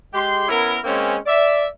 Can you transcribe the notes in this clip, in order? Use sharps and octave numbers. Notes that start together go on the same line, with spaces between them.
G#3 G4 C6
B3 C#4 E4 A#4
G#3 A#3 C4 C#4
D5 E5